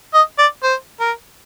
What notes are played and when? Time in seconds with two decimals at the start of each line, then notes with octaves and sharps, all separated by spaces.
0.14 D#5
0.39 D5
0.63 C5
1.00 A#4